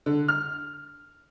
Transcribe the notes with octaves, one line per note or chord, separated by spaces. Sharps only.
D3
F6